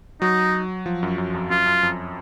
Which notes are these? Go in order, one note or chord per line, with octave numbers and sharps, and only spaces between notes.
F#3 D#4
F3
F#2
F#2
F2
F#2 F4
F#2
F2